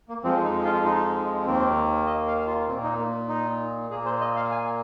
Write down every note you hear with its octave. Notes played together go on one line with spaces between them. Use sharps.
A#3
F2 F3 G#3 C4
D#4
F4
D#4
D#2 D#3 A#3 C4
D#5
F5
F4
A#2 A#3 C4
D#4
A#3
D#4
A#2 A#3 G#4
C5
D#5
F5
G#5